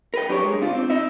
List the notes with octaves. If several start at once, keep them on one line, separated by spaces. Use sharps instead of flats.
A#4 B4 G5
F#3 D4 G4 A#4 C#5
G#3
C#3 D4 F4
C4
D#4 E5